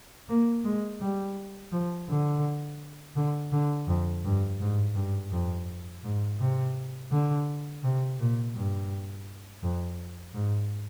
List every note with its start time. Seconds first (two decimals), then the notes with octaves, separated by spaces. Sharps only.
0.29 A#3
0.64 G#3
1.01 G3
1.72 F3
2.09 D3
3.16 D3
3.52 D3
3.88 F2
4.24 G2
4.60 G#2
4.95 G2
5.32 F2
6.04 G#2
6.39 C3
7.11 D3
7.83 C3
8.19 A#2
8.55 G2
9.63 F2
10.35 G#2